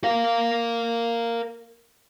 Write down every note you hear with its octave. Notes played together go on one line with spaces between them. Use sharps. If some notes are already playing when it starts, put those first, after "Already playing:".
A#4 F5